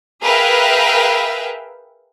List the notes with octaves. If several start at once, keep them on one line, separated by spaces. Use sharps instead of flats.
G#4 A#4 B4 E5 F5 G5